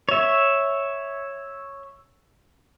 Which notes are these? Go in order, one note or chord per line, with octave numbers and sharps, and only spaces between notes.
C#5 E5